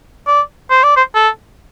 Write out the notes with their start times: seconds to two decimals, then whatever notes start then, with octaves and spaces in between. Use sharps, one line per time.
0.27 D5
0.71 C5
0.84 D5
0.97 C5
1.15 A4